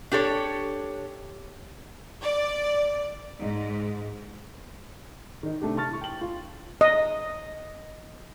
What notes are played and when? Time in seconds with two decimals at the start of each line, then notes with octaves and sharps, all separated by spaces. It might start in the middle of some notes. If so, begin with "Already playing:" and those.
0.12 D4 G4 A4 C#5
2.22 D5
3.39 G#2
5.43 D#3 D#4
5.61 C3 A3 D4 G4
5.77 A5 C#6 F6 A6
5.89 E4 C#6
6.01 G5 F#7
6.21 F4
6.81 D#5